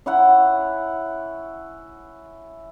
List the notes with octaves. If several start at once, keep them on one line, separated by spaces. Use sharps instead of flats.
C#4 E4 F#5